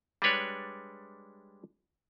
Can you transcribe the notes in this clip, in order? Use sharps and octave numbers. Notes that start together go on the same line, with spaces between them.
G3 G#3 D4 B4 C#5 D5